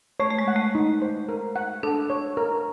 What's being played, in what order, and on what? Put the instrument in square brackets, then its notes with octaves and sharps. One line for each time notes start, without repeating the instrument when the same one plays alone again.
[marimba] A3 [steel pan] C#5
[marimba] A3
G#3
[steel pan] F#5
[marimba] A3
[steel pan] D#4
C5
A#4
F#5
[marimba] D4 [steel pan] A4
[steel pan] C#5
A#4